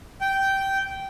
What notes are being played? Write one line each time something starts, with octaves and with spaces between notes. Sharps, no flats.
G5